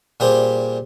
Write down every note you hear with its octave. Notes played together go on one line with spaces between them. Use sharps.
A#2 G3 G4 G#4 C5